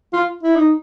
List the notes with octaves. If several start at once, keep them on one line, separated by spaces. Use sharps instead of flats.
F4
E4
D#4